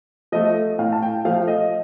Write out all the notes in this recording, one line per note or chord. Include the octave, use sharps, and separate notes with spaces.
F3 A3 D#5
A2 F5
A5
G5
F3 A3 F5
D#5